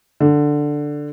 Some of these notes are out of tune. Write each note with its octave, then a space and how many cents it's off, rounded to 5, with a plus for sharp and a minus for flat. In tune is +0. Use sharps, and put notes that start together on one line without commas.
D3 +5